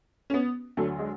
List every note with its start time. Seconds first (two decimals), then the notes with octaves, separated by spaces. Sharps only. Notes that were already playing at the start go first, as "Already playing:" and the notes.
0.30 C#4
0.34 B3
0.77 D2 D3 F#3 A3
0.99 G#3